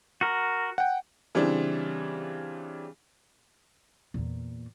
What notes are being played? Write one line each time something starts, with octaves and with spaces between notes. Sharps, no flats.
F#4 A#4
F#5 G5
C#3 E3 G3 C4 D4
E2 A#2